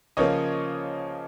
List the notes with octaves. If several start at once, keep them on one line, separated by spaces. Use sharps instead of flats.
C#3 F3 A#3 C#5 D#5